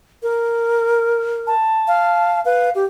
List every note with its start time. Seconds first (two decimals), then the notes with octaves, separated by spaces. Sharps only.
0.23 A#4
1.47 A5
1.87 F5
2.45 B4 F5
2.75 G4